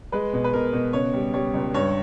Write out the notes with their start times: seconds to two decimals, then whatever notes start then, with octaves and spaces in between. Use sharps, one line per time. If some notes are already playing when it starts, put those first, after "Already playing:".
0.12 G#3 B4
0.33 B2
0.44 B4
0.53 B2 A#4
0.73 B2
0.93 C#3 C#5
1.13 G3
1.34 G3 C#5
1.54 C#2
1.74 G2 C#5